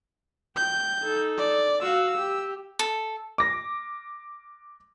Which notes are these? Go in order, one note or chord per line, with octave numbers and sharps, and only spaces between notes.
G5 G6
D#4 A4
D5
F#4 F5 E6
G4
A4
D6 A#6